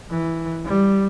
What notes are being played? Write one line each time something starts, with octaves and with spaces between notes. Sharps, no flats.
E3
G3